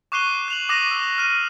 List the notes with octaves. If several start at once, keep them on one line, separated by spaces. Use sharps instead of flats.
C#6 D6 F#6 C7 D#7 G7
F#6 F7 F#7
D6 D#6 F#6 A#6 D#7 F7
E6
F6 D#7